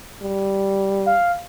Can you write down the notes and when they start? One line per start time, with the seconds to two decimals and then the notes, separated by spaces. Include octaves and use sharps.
0.23 G3
1.06 F5